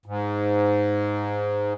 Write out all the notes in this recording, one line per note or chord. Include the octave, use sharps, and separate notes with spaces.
G#2